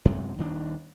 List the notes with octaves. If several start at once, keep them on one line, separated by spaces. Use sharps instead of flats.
F#2 C3 G#3
D#1 D#3 D4